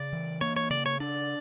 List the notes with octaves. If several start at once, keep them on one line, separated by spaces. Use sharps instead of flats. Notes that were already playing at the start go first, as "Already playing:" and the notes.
Already playing: C#3 D5
E3
A#3 C#5
C#5
C#3 D5
C#5
D4 D5